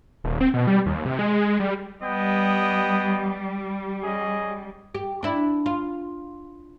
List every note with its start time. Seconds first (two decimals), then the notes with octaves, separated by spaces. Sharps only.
0.24 D#1
0.41 C4
0.54 B2
0.67 G3
0.86 D#2
1.06 C3
1.19 G#3
1.60 G3
2.01 G3 B3 D#5 G5
4.03 C#4 G#4 D#5
4.95 G4
5.23 D4 E4
5.66 F4